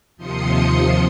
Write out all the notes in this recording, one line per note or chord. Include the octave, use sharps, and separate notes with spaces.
D#2 C3 F3 C6 D#6 C#7